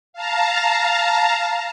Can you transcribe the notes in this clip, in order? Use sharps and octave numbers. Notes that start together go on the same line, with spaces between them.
F5 A5 A#5